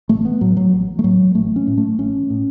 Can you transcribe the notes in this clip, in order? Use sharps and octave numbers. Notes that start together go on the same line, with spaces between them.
A1 A3
B3
A2 F#3
F#3
A1
A3
A2 F#3
A1 A3
C#4
A2
A3
A1 C#4
A2